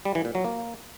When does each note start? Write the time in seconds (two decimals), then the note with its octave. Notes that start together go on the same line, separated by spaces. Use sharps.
0.05 G3
0.15 E3
0.25 A#2
0.35 F#3
0.45 A#3